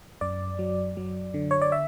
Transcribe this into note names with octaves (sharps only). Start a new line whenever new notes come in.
F#2 D5
F#3
F#3
D3
C#5
D5
E5